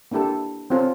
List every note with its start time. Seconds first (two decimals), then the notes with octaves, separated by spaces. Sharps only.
0.11 A#3 D4 E4 G4 A4
0.70 C4 C#4 F4 A4 C5